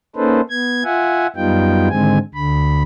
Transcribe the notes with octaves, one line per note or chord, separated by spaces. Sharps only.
A#3 C#4 D#4 A4 B4 C5
B3 G#6
F4 E5 F#5 G#5
F#2 G3 B3 D#4 F4 G5
G#2 D3 D#3 G#3 C4 G#5
D2 D3 B5